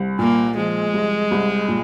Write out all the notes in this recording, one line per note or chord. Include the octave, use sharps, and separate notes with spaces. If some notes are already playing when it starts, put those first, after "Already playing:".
Already playing: C2
A#2 A#3
F3 G#3
C2
C2
A#2